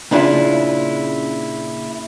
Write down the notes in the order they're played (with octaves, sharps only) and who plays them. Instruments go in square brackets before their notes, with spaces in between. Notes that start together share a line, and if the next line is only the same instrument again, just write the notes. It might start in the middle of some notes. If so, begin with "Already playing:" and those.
[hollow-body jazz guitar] A#2 C#3 D4 E4 F4